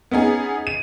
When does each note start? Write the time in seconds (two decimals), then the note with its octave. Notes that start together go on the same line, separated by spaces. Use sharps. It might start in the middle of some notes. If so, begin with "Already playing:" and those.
0.11 B3 C#4 D#4 G#4
0.67 D#7